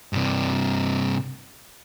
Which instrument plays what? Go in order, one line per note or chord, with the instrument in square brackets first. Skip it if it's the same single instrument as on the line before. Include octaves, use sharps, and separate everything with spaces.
[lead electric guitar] G2 C3